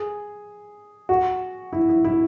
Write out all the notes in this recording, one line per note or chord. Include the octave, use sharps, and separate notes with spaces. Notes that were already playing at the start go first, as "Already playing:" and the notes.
Already playing: G#4
F#4
E4
E4
E4